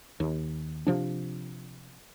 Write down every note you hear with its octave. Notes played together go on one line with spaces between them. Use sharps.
D#2
C3 F3 D4